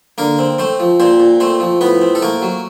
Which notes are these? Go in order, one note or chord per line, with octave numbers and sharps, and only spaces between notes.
D3 A#3 A#4
C4
A3 C4 C5
F3
A#2 C4 C5
A#2
A3 C4 C5
F3
A2 B3 B4
C4
A4
A3 A#3 A#4
F#3